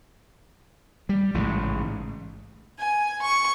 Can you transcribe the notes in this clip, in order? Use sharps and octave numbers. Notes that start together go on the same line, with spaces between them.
G3
A1 G#2 C#3
G#5
C#6